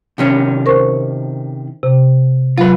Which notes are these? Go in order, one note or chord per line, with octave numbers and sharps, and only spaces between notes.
C3 D#3 C#4
A#4 C5 C#6
C3
F#3 F4 B4